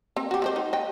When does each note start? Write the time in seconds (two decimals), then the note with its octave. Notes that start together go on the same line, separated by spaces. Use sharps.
0.16 C4
0.31 F#4 G4
0.42 G#3 C4 C5
0.56 D#4
0.73 D#5 G5